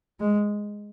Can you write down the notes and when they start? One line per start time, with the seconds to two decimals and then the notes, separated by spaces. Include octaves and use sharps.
0.20 G#3